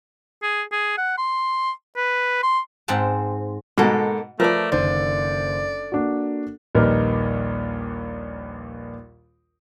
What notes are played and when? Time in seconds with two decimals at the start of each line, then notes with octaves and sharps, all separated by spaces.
0.43 G#4
0.72 G#4
0.98 F#5
1.18 C6
1.96 B4
2.43 C6
2.88 G#2 C4 F#5 A5
3.78 G#2 B2 A#3 A4
4.40 F3 A3 A#4 B4 D5
4.72 F#1 D3 D#3 C5 D5
5.92 A#3 D4 F#4
6.75 A#1 D#2 G3 D#4 A#4 B4